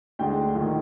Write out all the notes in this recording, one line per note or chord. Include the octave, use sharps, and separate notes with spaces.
D2 D3 G#3 G5
A#1
D#3